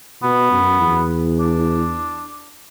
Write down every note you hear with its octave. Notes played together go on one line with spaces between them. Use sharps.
B2 B3
F#2
E2
D4